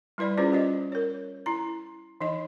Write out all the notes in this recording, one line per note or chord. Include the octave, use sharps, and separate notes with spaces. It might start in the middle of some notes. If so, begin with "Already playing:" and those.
G3 E4 B4 D5 B5
C#4 F4 G#4 B4 C5 D5
G4 C5 D#5
A#4 C#5
E4 A#5
E3 D#4 D#5